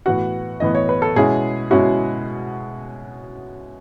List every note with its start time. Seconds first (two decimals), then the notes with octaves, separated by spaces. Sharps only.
0.06 A2 E3 B3 F#4 F#5
0.60 A2 E3 B3 D#5
0.75 C#5
0.89 B4
1.02 A4
1.16 B2 G#3 C#4 E4 G#4
1.71 B2 G#3 C#4 E4 F#4